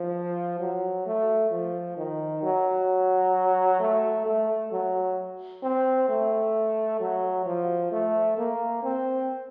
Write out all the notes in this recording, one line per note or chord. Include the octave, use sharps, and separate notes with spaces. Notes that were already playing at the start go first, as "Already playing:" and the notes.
Already playing: F3
F#3
A3
F3
D#3
F#3
A3
A3
F#3
C4
A3
F#3
F3
A3
A#3
C4